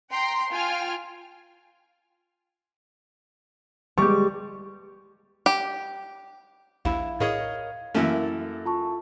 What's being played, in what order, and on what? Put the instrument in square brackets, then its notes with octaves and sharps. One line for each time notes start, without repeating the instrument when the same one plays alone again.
[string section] G5 A#5 C6
F4 G5 G#5 F6
[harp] G3 G4 [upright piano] G#3 C#6
[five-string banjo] G4
[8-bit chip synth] A#1 D#2 [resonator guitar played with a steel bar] E4 [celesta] F5 B5
[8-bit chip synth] A2 G#4 [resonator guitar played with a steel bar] A#4 C#5 D#5 [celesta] F5 G#6
[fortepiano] F#2 A#3 [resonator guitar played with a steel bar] E3 E4 A4 [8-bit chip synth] A3 C#4
[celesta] F4 A5 C#6